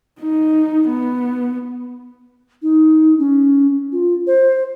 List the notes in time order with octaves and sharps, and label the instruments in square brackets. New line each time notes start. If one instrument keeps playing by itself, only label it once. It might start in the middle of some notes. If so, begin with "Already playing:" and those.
[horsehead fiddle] D#4
B3
[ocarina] D#4
C#4
F4
C5